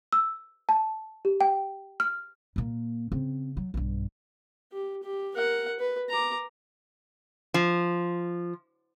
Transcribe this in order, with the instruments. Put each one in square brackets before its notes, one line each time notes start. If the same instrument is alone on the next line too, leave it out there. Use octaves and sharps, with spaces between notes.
[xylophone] E6
A5
G4
G5
F6
[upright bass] A#2 A#3
C#3 C4
F#3
B1 G2
[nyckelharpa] G4
G4
A#4 F#5
B4
A#5 D6
[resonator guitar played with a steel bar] F3